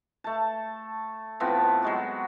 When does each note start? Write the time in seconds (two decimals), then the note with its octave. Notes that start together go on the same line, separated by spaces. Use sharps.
0.24 A3 A5
1.40 A2 F3 B3 C4
1.82 F#3 G#3 F#4